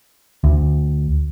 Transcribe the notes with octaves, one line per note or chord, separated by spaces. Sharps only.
D2